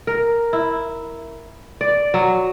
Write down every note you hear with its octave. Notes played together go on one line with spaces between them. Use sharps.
A#4
E4
D5
F#3